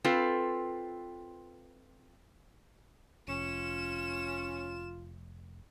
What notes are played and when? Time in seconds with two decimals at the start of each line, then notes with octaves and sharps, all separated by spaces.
0.04 C4 F4 A4 B4
3.28 F1 C#4 F4 E7